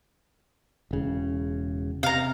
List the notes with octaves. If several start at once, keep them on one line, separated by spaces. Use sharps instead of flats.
E1 C#3
C3 F5 A#5